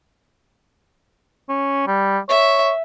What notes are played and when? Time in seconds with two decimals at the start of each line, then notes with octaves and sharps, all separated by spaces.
1.49 C#4
1.87 G3
2.29 C#5 E5